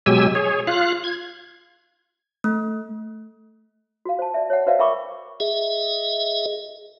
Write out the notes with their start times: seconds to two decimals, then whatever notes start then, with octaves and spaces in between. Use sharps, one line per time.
0.06 B2 F#3 G#3 G4 G#5 E6
0.35 G#4 C#5
0.67 F4 F5 F#6
1.04 G#6
2.44 A3
4.05 F#4 F5
4.19 C5 A5
4.34 D5 E5
4.50 C#5 F#5
4.66 F#4 B4 C5 D5 E5 F5
4.79 A#4 E5 G5 B5 C#6 D6
5.40 G#4 D#5 E5